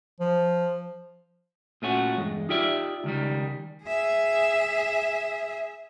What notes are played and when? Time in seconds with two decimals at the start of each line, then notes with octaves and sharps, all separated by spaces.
0.20 F3
1.82 A#2 A3 C#4 F#4
2.17 E2 G2 G#3
2.49 D#4 F4 G4 D5 E5
3.04 C#2 D#3 G3
3.84 G#4 E5